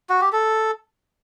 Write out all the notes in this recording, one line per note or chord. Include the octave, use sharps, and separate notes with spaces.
F#4
G4
A4